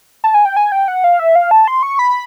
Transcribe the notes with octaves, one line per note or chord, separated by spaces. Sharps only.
A5
G#5
G5
G#5
G5
F#5
F5
E5
F5
A5
C6
C#6
B5